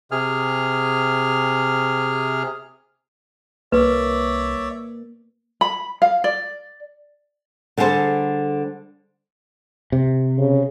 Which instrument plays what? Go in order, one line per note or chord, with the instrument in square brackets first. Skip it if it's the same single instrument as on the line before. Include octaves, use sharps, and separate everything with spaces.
[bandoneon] C3 G#4 F6
[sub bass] C2 [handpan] A#3 [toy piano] B4 [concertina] C#5 D5 E5
[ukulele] B5
F5
D5
[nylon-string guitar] D3 G3 G#4 A4 C5
[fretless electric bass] C3
[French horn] C#3